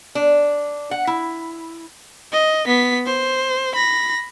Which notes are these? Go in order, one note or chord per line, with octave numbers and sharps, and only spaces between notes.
D4
F#5
E4
D#5
B3 B6
C5
B5 A#6